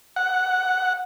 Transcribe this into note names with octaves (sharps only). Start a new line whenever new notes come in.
F#5